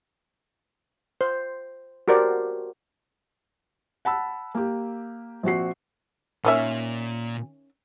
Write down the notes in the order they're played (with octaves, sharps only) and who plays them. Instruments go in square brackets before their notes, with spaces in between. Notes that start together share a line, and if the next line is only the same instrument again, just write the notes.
[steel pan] C5
F#4 G4 A#4 C5 D5
[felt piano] F#5 A5 B5 E6
A#3 G4
A#1 C4 F#4 C7
[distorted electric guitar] A#2 [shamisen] D#3 C#4 E5